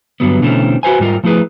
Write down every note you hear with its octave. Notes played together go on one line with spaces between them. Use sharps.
G2 D3 F#3 G3 B3
B2 D3 E3 A3 C4 C#4
F#4 B4 C5 G#5
G#2 G3 F4 A#4
F3 A3 E4 G#4 B4